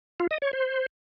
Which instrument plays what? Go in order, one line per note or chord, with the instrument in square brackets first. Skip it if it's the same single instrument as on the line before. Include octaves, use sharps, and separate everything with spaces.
[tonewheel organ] F4
D#5
C#5
C5